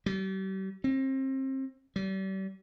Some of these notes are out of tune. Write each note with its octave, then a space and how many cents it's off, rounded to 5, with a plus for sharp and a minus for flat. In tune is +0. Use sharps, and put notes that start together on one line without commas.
G3 -40
C4 +30
G3 -35